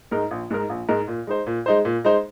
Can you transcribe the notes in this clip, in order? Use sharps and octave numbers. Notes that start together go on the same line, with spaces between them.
G#2 G#3 D#4 A#4
A#1
G#2 G#3 D#4 A#4
A#1
G#2 G#3 D#4 A#4
A#2
G#3 D#4 C5
A#2
G#3 D#4 C5
A#2
G#3 D#4 C5